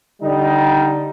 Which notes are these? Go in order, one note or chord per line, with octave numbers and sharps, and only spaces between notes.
D3 G3 D#4